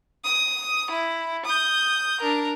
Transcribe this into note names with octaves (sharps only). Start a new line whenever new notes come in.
D#6
E4
D#6 G6
D4 A#4